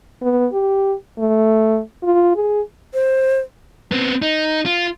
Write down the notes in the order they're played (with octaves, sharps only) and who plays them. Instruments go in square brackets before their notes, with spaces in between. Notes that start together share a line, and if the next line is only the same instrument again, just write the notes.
[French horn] B3
G4
A3
F4
G#4
[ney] C5
[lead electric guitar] B3 C4
D#4
F4